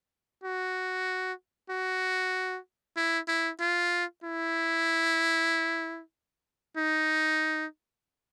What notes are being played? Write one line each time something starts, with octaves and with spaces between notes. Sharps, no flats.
F#4
F#4
E4
E4
F4
E4
D#4